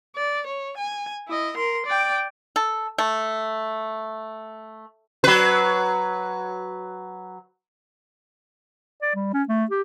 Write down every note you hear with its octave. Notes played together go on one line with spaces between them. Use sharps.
D5
C#5
G#5
E4 D#5
A#4 C6
D5 G5
A4
A3
F#3 B4
D5
G3
C#4
A3
G4